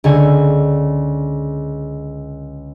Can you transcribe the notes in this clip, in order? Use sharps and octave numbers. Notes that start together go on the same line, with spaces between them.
C#2 D3 G#5 C#7